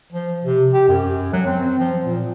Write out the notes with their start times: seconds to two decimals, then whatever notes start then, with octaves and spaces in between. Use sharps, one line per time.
0.13 F3
0.44 C3
0.73 G4
0.88 F#2
1.33 F#3
1.46 C4
1.79 F3
2.03 A#2